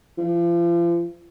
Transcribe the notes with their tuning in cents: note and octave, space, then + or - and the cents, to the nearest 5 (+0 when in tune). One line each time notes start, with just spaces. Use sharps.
F3 -35